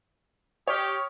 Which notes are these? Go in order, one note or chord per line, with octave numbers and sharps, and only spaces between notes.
G4 C#5 D#6 F6